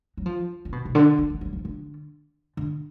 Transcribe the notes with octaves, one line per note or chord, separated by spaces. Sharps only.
F#3
F3
D3
B2
B2
D3
D3
D#3
F#3
F3
D3
D3